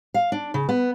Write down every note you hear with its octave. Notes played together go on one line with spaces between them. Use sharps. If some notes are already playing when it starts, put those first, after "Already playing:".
F5
D4
C#3
B3